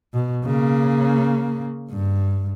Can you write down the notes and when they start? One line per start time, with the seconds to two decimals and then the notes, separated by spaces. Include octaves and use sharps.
0.14 B2
0.45 C#3 A#3
1.91 G2